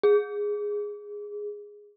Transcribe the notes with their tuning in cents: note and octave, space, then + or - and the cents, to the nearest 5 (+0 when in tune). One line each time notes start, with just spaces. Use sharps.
G#4 -5